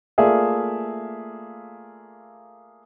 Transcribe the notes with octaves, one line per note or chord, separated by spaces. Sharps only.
A3 A#3 F4 G#4 D5 E5